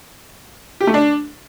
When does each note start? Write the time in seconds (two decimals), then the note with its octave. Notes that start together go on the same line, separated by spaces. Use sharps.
0.80 G4
0.87 A3
0.94 D4